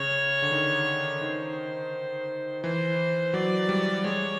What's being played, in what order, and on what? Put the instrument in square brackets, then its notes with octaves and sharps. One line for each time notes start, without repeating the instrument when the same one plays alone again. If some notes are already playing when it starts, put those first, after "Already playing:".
Already playing: [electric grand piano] C#3 [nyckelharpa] C#5
[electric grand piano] D3
D#3
[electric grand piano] D#3 [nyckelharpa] C5
[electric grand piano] E3 [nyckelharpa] C5
[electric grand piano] F#3 [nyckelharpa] D5
[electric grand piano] G3
[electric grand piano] G#3 [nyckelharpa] C#5